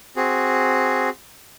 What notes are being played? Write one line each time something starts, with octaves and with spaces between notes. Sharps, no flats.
C4 F#4 G#4